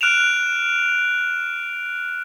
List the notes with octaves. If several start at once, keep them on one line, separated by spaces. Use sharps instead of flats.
F6 F#6 D7 E7 F7